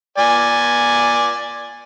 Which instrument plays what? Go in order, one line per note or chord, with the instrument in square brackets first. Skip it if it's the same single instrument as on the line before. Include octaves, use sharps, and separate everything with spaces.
[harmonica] D5 G#5